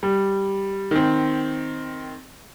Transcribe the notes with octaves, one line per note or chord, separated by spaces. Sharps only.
G3
D#3 C4